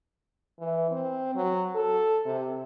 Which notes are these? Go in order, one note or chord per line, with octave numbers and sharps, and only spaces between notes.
E3
C4
F#3
A4
C3